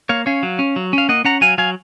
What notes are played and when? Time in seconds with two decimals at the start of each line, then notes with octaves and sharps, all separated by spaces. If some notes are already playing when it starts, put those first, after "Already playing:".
0.09 A#3 C#5 F5
0.26 C#4 C#5 F5
0.43 F#3
0.59 C#4
0.76 F#3
0.93 C#4 F5
1.09 A#3 D#5 F#5
1.25 C#4 F#5 A#5
1.41 F#3 F5 G#5
1.58 F#3 F5 G#5